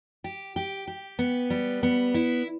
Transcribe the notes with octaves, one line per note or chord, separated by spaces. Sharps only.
G4
G4
G4
B3
G3
B3
E4